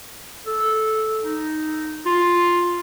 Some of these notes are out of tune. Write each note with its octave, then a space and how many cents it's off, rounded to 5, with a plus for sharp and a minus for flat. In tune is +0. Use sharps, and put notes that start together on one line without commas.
A4 -10
D#4 -5
F4 +5